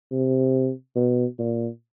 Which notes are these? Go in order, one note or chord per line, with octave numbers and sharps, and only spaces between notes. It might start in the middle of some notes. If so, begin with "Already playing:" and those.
C3
B2
A#2